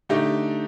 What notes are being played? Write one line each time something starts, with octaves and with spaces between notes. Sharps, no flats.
D3 A3 D#4 G4